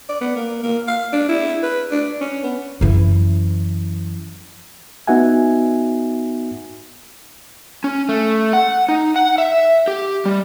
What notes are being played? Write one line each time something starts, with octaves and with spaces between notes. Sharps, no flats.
D5
B3
A#3
A#3
F5
D4
E4
B4
D4
C#4
B3
F#2 E3
B3 D#4 F#4 E5 F#5 G#5
C#4
A3
F#5
D#4
F#5
E5
G4
G3